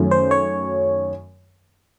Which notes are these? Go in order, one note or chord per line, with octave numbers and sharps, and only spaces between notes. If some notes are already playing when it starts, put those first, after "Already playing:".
Already playing: F#2 D#3 F#3 A3
C5
C#5